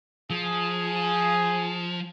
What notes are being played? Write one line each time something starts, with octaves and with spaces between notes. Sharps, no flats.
F3 G#4